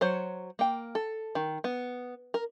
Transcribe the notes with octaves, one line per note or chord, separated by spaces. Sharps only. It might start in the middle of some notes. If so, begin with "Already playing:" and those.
F#3 C5 C#5
A#3 G5
A4
D#3
B3
A#4